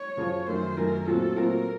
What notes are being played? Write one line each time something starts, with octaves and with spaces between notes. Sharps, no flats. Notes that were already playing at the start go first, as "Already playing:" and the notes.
Already playing: C#5
F#2 C#3 F3
F#2 D#3 A3 C5
F#2 D#3 A3 A#4
A#2 F#3 A3 C4 A4
A#2 F#3 A3 C4 A#4